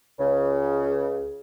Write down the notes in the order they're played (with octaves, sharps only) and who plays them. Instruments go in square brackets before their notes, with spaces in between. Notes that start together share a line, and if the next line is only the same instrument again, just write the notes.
[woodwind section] C#2 C#3